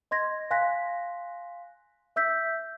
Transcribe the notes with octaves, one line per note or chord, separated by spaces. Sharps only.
D#5 C6 G#6 A#6
F5 G#5 C6 F#6 A#6 B6
E5 E6 G6 B6